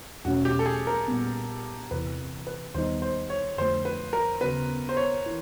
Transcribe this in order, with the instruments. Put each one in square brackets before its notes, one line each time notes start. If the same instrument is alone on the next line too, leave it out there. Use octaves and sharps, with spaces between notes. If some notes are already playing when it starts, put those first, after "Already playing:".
[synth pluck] E2 B2 F#3 A3 C#4 [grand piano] F#4
[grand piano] G4
A4
G#4
A#4
[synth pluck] A#2 G3 B3
[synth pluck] E2 C3 E3 [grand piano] B4
[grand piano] B4
[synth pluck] D#2 D#3 G3 B3 D#4 [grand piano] C5
[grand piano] C5
C#5
[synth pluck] F2 D3 F3 A3 [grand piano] C5
[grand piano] B4
A#4
[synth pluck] D#2 C#3 F#3 B3 [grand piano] B4
[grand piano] C5
C#5
[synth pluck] E3